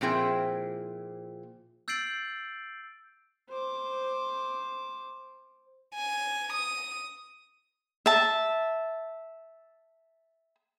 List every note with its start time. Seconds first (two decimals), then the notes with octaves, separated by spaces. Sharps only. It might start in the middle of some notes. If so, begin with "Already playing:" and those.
0.01 A#2 F3 C4 E4 G#4 G5
1.88 E6 G6 A6 C7 D7 F#7
3.49 C5 D6
5.95 G#5
6.52 D#6
8.06 E5 A5